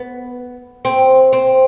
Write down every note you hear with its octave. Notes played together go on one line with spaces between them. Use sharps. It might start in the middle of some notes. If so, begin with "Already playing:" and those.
Already playing: B3
C4
C4